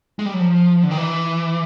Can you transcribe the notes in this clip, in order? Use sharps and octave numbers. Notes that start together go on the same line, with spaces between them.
G#3
G3
F#3
F3
D3
D#3
E3